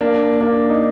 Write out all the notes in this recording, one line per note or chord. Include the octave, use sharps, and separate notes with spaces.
A#3 D4
A#3 D4
D#4